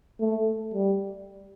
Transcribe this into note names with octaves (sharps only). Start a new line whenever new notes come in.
A3
G3